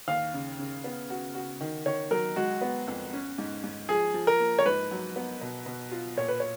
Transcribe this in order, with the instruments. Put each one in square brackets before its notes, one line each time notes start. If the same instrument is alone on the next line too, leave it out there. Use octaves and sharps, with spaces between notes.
[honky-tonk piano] D#2 [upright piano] F5
[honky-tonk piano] C#3
C#3
B3
F#4
F#4
D#3
[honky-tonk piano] D#3 [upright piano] C#5
[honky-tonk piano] F#3 [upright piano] A#4
[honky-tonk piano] G#3 [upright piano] F#4
[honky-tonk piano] B3
F2
C#4
G#2
G#2
[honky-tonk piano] F3 [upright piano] G#4
[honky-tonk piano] F3
[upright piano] A#4
[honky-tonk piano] A#3
[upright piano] C#5
[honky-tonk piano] G#2 [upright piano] B4
[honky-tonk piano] F#3
B3
B2
B2
F4
[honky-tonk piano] A#2 [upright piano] C#5
[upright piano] B4
C#5